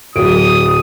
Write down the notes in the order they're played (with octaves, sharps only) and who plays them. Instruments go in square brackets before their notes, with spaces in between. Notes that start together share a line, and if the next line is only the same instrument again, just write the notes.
[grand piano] D1 F#3 D7 [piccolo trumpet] D#6